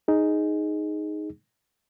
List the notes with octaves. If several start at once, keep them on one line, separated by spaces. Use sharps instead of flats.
D#4 G#4